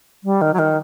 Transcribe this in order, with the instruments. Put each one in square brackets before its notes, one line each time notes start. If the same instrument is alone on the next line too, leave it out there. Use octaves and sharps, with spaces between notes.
[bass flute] G3
D#3
F#3
D#3